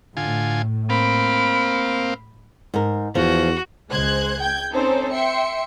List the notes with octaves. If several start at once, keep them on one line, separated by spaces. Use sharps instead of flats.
A2 D3 F4 G#5
A#3 C4 F5 B5 D7
G#2 A#4
E2 F3 F#4
C#2 G#3 C5 F#6 G#6
G5 G6 G#6
C4 C#4 D#4 A4 C5
E5 G5 C6 C#7